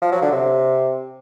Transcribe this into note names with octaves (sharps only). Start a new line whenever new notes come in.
F3
F#3
D3
C3